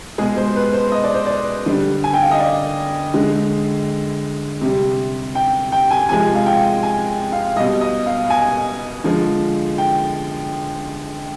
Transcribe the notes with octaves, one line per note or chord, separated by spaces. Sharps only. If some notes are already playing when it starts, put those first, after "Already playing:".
B2 G#3 G#4
C5
B4
C5
D#5
D5
C5
D5
D3 G3
G#5
G5
F5
D#5
D5
D3 G#3
C3 G3
G5
G5
G#5
C3 F3 G#3 G#5
F5
G5
G#5
F5
B2 G3 D#5
D#5
F5
G#5
D3 F3 G#3
G5